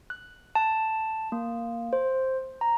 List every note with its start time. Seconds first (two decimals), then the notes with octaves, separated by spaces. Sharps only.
0.10 F#6
0.55 A5
1.32 A#3
1.93 C5
2.61 A#5